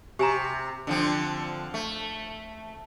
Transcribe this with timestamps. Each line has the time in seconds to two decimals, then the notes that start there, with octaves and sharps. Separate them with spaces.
0.19 C3 G4 G#5 A#5
0.87 D3 F3 C4
1.74 A3